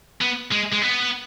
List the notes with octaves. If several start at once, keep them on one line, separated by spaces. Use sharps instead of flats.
B3
G#3
G#3
B3